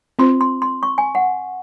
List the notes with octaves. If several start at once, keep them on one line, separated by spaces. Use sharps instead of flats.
C4 F4 C5 C6
C6
C6
C#6
G#5
F#5